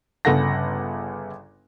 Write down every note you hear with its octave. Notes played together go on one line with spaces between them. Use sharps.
G1 C#3 A4 F#5 A#6